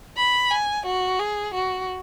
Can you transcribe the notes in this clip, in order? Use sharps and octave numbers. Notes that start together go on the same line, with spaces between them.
B5
G#5
F#4
G#4
F#4